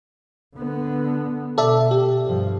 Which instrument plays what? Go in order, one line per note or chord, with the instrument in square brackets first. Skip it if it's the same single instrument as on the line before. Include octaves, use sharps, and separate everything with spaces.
[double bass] D3 B3
[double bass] B2 [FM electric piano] A4 D5 E5
[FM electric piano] G4
[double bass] G2 F3